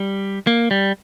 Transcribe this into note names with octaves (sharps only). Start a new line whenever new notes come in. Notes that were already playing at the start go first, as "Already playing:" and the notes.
Already playing: G3
A#3
G3